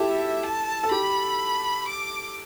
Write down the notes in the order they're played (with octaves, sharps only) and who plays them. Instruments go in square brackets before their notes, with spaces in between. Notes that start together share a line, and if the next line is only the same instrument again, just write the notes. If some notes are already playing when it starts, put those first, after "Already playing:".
Already playing: [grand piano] E4 G4 A4 [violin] E5
[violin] A5
[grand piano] A4
[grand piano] G4 [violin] B5
[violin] D6